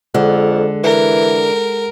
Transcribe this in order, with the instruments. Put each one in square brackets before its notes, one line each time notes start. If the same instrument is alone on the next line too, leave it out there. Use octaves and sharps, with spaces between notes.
[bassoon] F2 [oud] D3 [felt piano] G#3 F#5
[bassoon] E3 [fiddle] A#4